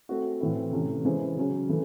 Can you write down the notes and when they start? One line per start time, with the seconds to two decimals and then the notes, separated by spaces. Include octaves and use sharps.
0.09 A3 C4 F#4
0.40 A2 E3 A3 C4 E4
0.72 C3 E3 A3 C#4
1.05 E3 G#3 C#4 G#4 C5
1.37 C#3 F#3 C#4 G#4
1.69 E3 A3